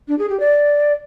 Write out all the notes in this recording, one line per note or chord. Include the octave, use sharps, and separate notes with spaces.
D4
G#4
G4
D5